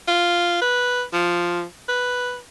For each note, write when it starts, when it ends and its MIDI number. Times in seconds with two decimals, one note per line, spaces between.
0.08 0.61 65
0.62 1.03 71
1.13 1.64 53
1.89 2.38 71